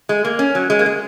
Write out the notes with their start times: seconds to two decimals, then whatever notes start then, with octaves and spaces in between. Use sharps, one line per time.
0.09 G#3
0.25 A#3
0.39 C#4
0.55 F#3
0.70 G#3
0.79 A#3
0.86 G#3